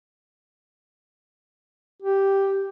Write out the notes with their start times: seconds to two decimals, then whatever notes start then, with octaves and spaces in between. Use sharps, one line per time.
2.02 G4